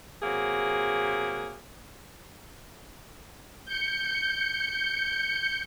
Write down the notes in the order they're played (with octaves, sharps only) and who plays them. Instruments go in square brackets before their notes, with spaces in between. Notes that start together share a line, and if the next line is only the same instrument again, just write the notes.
[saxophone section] C3 F#3 A#3 G#4
[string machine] G6 C#7